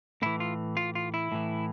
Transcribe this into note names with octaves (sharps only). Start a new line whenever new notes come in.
A2 E3 E4
F4
F4
F4
E4
A2 E3